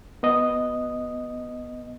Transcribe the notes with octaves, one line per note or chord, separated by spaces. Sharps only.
B3 D#5